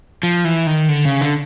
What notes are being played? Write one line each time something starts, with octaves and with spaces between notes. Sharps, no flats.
F3
E3
D#3
D3
C#3
D3